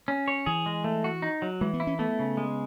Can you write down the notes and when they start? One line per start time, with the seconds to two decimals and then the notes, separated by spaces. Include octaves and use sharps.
0.08 C#4
0.28 C#5
0.46 E3 G#4
0.66 G#3
0.84 A3
1.04 F#4
1.22 D#4
1.42 F#3
1.61 E3 G#3
1.74 B3
1.80 E4
1.87 C#4
1.99 A3 B3
2.19 C#3
2.37 G#3